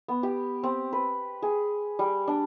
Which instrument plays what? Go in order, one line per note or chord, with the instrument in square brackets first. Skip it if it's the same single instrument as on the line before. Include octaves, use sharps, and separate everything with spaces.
[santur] B3
G4
C4
B4
G#4
G3
D4